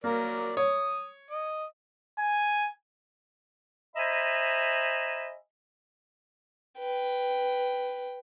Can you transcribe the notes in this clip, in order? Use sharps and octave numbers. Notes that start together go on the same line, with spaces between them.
F#3 A#3 A#4 D5
C#5 D#6
D#5
G#5
C5 D#5 E5 G#5 A#5 B5
B4 G5